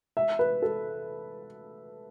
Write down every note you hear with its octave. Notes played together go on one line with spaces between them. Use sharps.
E5
B4
A4